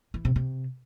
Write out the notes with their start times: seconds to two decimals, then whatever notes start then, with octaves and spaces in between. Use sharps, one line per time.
0.14 E3
0.25 C3
0.36 C3